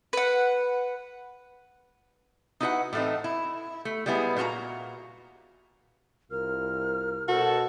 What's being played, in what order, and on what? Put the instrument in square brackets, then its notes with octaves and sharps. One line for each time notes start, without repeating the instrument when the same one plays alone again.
[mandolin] B4 F#5
[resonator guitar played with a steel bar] D#4 E4 F#4 A4 B4 F#5
A2 E3 A3 C4 D#4
E4
A3
G3 G#3 B3 E4 G#4
A#2 A#3 F4 F#4 A#5
[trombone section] C2 F4 [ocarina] A#4 [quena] F6
[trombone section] B2 A4 [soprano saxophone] F#4 [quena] C5